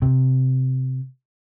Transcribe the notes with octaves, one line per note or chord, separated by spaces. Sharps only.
C3